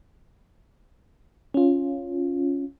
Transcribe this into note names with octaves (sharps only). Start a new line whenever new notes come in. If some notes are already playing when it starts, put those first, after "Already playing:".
C#4 F4